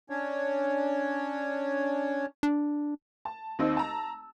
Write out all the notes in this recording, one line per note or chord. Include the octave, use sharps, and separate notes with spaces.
C#4 D4 C#5
D4
A5
D#2 C4 D#5 E6
A5 A#5